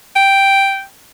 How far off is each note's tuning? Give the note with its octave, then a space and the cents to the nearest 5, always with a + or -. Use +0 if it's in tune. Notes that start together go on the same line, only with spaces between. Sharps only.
G5 +0